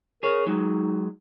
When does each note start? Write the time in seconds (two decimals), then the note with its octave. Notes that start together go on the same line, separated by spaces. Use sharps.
0.23 G#4 A#4 C#5
0.47 F#3 G#3 D#4